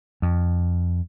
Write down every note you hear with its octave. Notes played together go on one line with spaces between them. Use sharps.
F2